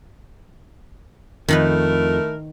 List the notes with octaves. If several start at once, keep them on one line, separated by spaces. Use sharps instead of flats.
F2 D#3 A3 D#4 E4 A#4 B4